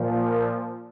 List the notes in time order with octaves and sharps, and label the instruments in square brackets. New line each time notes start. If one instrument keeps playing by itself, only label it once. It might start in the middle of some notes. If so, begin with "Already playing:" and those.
Already playing: [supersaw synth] A#2 F3